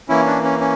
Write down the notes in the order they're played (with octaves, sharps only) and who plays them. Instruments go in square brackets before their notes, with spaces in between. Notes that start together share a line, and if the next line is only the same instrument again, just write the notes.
[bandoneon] E3 A#3 C#4 E4
D4
C#4
C#4